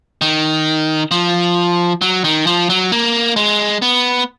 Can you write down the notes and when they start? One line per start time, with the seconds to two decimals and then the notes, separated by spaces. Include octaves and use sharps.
0.21 D#3
1.11 F3
2.01 F#3
2.24 D#3
2.47 F3
2.70 F#3
2.92 A#3
3.36 G#3
3.82 B3